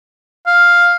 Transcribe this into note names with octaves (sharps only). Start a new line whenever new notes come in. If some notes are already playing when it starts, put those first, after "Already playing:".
F5